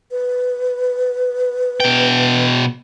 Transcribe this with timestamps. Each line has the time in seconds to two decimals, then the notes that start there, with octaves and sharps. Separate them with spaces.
0.11 B4
1.80 B2 G5